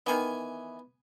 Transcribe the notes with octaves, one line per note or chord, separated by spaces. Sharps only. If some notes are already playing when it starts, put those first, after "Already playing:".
D#3 E3 B3 G#5